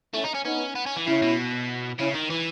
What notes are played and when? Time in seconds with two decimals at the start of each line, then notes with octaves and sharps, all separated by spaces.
0.14 A3 C#4 E4
0.24 D#4
0.34 C#4
0.45 B3 C#4 D#4
0.75 B3
0.86 C#4
0.96 E3
1.06 C#3 C#4 E4
1.22 B2
1.99 C#3 C#4 E4
2.14 D#3
2.30 E3